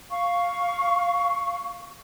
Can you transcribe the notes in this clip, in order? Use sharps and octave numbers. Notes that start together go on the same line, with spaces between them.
F5 C#6